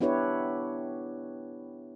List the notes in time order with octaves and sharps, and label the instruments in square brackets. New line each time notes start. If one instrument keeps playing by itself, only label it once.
[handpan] B3 D4 E4 G4 B4 C#5